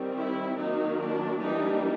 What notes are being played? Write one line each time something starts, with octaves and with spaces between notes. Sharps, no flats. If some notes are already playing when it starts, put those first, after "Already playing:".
Already playing: D#3 G3 C4
E4
D#3 F#3 A#3 D#4
D4
E3 G3 A#3 D4 D#4